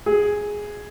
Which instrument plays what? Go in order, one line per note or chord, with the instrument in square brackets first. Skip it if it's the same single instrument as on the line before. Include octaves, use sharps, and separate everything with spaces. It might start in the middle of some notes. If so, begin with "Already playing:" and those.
[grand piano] G#4